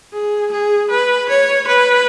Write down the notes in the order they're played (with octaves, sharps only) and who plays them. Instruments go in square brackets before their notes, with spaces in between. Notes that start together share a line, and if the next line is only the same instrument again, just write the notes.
[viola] G#4
G#4
B4
C#5
B4